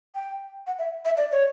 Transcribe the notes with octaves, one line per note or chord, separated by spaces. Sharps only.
G5
F#5
E5
E5
D5
C#5